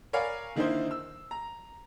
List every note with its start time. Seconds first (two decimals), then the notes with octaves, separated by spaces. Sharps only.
0.13 A#4 C#5 D5 F5 G#5 B5
0.56 D3 D#3 A#3 D#4 E4 C5
0.91 E6
1.31 A#5